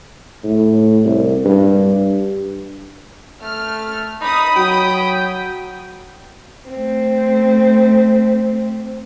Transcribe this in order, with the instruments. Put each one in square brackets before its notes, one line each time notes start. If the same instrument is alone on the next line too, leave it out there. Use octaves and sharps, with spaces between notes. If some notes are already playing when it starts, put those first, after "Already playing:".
[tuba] A2
C2
G2
[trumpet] A3 [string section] F6
[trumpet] D#4 [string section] B5 D#6
[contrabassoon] F#3 [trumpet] G5
[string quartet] A3 C4